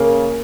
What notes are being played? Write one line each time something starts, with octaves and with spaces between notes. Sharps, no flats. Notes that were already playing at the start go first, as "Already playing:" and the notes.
Already playing: C#3 A#3